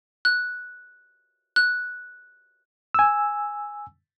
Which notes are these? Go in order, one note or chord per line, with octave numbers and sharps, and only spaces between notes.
F#6
F#6
G#5 E6